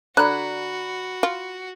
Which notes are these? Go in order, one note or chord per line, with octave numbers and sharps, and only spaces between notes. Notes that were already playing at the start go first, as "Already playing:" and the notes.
D3 F#4 D5 A#5 B5 F#6
F4